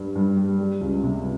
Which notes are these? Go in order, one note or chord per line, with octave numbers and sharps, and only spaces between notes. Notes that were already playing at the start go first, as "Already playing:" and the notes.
Already playing: G2 G3
G2
G3
G3
C#2
C3